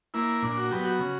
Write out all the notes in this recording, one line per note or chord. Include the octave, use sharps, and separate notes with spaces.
A#3 E4
A#2 D4
F#4
F#3 B3 G4
F#4
C#3